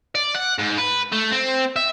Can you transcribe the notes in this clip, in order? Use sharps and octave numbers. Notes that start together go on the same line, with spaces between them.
D5
F#5
G#2
B4
A3
C4
E5